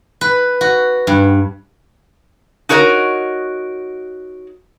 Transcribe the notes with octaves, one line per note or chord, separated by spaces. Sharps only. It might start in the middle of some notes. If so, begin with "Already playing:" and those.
B4
F#4
G2
D#4 F#4 A#4 C#5 D#5